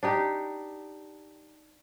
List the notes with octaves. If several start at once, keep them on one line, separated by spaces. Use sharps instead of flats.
D4 D#4 G4